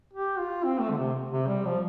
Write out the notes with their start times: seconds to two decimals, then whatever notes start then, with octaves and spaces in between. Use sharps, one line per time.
0.13 G4
0.39 F4
0.64 C4
0.80 A3
0.90 D3
0.98 C3
1.31 C3
1.48 G3
1.65 F3